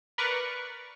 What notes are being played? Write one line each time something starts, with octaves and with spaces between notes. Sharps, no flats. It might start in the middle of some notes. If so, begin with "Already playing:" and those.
A#4 B4 D5 C#6